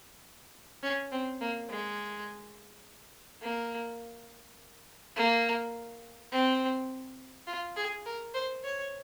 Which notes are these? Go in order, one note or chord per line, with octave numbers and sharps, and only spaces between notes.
C#4
C4
A#3
G#3
A#3
A#3
C4
F4
G#4
A#4
C5
C#5